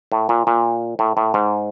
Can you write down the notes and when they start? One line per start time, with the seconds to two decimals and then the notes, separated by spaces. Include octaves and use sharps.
0.12 A2
0.29 A#2
0.47 A#2
0.99 A2
1.17 A2
1.34 G#2